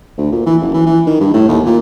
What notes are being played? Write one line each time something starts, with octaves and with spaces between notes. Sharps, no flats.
D2
A#2
E3
F#1
E3
E3
D#3
G2
A2
D#2
A#2